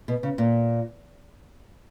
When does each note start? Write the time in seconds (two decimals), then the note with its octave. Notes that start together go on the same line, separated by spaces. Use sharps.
0.08 B2
0.23 C#3
0.38 A#2